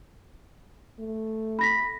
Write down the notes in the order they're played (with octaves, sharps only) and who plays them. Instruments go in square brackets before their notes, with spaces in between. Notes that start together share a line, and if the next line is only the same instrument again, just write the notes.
[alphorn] A3
[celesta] B5 A#6 B6